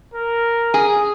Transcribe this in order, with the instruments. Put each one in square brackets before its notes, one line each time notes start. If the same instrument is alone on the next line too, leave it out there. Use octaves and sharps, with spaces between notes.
[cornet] A#4
[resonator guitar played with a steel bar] G#4